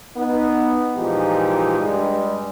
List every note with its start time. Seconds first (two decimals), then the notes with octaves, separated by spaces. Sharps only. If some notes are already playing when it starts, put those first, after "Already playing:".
0.15 B3 D#4
0.96 A#2 E3 F3 G#3 D#4 G4
1.80 G2 G3 G#3